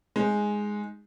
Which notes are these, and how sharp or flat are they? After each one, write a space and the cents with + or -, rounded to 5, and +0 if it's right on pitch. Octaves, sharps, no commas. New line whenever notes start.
G#3 +0 D#4 +0